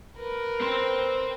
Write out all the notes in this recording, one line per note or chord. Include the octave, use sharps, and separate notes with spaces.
A#4 B4
C4 C5